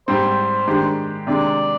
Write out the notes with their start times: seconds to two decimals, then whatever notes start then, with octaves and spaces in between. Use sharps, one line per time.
0.08 G#2 G3 C4 C5
0.67 D#3 G#3 D4 G4
1.27 C3 D#3 G#3 D4 D5